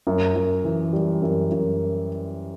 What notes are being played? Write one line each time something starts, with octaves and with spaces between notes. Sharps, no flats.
F#2
F#2
E3
G3
F#2
F#2